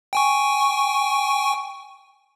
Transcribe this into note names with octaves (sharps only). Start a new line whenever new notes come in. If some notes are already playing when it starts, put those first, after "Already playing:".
G5 G#5 C#6